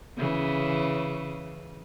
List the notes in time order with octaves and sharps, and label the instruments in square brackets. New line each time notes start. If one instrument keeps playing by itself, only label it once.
[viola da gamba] C#3 E3